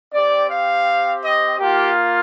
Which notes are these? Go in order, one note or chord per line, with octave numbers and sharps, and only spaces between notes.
C4 G4 D5
F5
D#5
A#3 F4 G4